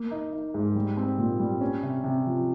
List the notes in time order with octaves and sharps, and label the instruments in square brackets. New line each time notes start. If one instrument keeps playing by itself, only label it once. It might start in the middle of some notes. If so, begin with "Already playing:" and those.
Already playing: [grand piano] A#3
D#4
D#4
G#2
G3
C4
A#2
G3
C#4
C3
C3
F3